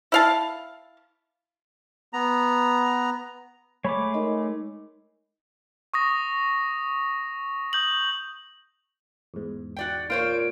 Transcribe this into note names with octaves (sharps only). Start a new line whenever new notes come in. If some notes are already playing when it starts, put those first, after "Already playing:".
E4 F5 A5
B3 A#5
G#3 A3 C#5 B5 D6
D#4 A#4 D#5
C#6 D#6 A#6
D#6 G6 F#7
E2 G#2
F#4 D5 G5
A#2 F4 C5 C#5 D7